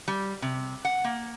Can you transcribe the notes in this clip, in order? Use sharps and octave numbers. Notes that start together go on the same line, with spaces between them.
G3
C3
F#5
A#3